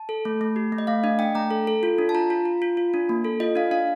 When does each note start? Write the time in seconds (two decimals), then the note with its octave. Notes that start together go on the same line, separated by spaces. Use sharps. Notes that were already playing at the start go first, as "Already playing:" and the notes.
Already playing: A5
0.09 A4
0.25 A3
0.41 A3
0.56 G4
0.72 A3
0.78 D#5
0.87 A3 F5
1.04 D4 D#5
1.19 D4 G5
1.35 A3 A#5
1.51 A4
1.67 A4
1.83 F4
1.98 D4
2.09 A5
2.15 F4 A#5
2.30 F4
2.45 F4
2.62 F4
2.77 F4
2.94 D4
3.09 A#3
3.24 A4
3.40 F4 D#5
3.56 D4 F5
3.71 D4 F5